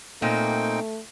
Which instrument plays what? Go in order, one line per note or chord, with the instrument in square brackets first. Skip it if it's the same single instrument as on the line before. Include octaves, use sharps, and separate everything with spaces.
[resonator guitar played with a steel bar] A#2 A#3 [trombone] A3 [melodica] C4 D#4 G5